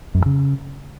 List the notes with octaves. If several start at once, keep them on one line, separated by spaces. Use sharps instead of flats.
F#2
G2
C#3